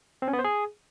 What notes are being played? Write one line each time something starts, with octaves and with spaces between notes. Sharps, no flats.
C4
C#4
B3
C5
G#4